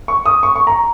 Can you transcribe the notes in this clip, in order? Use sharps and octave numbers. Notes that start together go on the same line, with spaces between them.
C#6
D#6
C#6
C#6
A#5